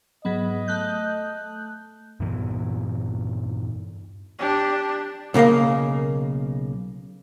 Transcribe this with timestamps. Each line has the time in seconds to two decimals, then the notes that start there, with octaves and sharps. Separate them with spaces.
0.25 G#2 F#3 B3 D#5
0.68 A3 F#6 G6
2.20 G2 A#2 E3 B3
4.39 D4 G4
5.34 B1 C#3 A#3 A#4 F5